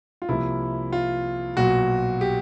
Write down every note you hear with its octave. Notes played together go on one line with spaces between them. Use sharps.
F4
C2 C3 F3 A#3 E4
F4
B1 A#2 F#3 F#4
G4